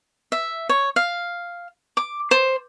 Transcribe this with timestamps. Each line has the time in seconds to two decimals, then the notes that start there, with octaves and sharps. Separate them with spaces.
0.32 E5
0.69 C#5
0.96 F5
1.97 D6
2.31 C5